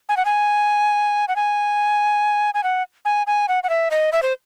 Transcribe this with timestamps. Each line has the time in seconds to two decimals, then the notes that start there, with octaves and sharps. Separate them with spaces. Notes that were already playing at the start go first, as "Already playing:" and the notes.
0.09 G#5
0.17 F#5
0.25 G#5
1.28 F#5
1.36 G#5
2.54 G#5
2.64 F#5
3.05 G#5
3.27 G#5
3.48 F#5
3.63 F#5
3.69 E5
3.91 D#5
4.13 E5
4.23 C5